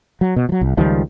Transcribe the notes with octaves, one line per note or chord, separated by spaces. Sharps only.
F#3
B2
F3 F#3
C2
C#2 D#3 F3 G3